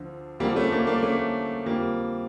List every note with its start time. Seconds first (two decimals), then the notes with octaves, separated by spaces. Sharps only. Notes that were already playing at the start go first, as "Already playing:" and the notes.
Already playing: D2 D3 F3
0.40 D2 D3 F3 G3 A#3
0.56 A3 C#4
0.72 A#3 D4
0.87 A#3 D4
1.03 A3 C#4
1.66 F2 D3 F3 G3 A#3